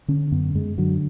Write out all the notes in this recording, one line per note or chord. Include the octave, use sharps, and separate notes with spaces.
D3 C#4
F#2 B3
F#2 G#3
D3 F#3